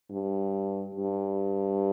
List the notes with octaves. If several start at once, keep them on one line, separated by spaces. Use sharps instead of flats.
G2
G2